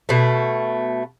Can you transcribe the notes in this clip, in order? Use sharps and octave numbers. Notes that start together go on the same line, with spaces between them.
B2 A3